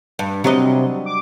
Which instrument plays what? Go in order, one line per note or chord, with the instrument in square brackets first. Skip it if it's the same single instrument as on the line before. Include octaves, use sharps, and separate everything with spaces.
[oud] G2
[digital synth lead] C3 [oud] F#3 G3 D#5
[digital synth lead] D6